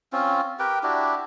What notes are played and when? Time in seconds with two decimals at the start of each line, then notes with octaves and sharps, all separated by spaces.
0.13 C4 C#4 F4
0.59 G4 A#4 B4 G5
0.83 D4 E4 F#4 G4